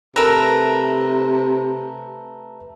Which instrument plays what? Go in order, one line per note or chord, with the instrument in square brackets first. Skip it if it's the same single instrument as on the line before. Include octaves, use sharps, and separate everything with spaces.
[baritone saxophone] C3 [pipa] A3 A#4 [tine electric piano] B4 A#5 E6